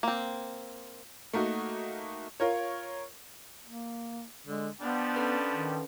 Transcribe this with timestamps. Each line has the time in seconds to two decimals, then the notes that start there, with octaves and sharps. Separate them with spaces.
0.03 A#3 C4
1.33 A3 A#3 D#4 F#4
2.40 F4 A#4 C#5
3.66 A#3
4.46 D3 G#3
4.81 B2 F3 G3 B3 D4
5.16 C#4 A4 B4
5.50 D#3